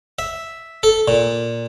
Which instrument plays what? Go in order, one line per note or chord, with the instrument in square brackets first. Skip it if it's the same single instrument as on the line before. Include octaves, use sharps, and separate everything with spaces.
[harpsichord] E5
A4
A#2